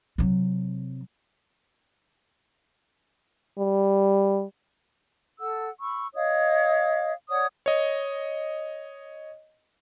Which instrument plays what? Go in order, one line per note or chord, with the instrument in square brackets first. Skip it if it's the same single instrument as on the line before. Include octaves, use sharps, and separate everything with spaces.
[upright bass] C3 F#3
[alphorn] G3
[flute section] A4 F#5 E6
B5 C#6 E6
C#5 D#5 F5 D#6
C#5 D5 F#5 D#6
[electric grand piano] C#5 D#5